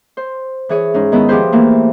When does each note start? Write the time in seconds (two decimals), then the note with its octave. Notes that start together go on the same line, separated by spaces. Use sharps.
0.17 C5
0.69 E3 G#4 C#5
0.94 G#2 C#4 D#4
1.12 D#3 G#3 B3 E4
1.29 F3 G4 G#4 B4 C5
1.52 E3 A3 A#3